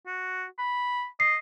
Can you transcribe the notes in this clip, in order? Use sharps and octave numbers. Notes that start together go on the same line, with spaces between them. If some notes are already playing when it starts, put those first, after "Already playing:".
F#4
B5
D#5 C7